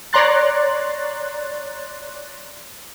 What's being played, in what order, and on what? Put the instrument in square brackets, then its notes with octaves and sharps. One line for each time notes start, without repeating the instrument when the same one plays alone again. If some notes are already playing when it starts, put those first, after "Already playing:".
[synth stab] C#5 D5 A#5 C6 F#6 A6